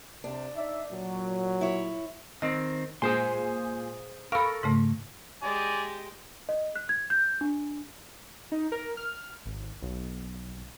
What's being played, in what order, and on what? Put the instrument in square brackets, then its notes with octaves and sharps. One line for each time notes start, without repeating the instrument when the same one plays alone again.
[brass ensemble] C3 [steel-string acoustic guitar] D4
[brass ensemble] D#4 D5 E5
A#2 F#3
[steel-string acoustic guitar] E4 C#5
[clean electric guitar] D#3 C4 [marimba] D#5
[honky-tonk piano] A#2 G#3 G#5 [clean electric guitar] G#4 C5 C6
[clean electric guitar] A4 A#4 [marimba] F5 B5 [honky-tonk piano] C#6 A#6
[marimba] G#2 C#3 A3
[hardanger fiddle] G#3 G4 [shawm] D5 [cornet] G#5
[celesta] D#5
F#6
G#6
G6
D4
[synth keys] D#4
A#4
F6
G#1
B1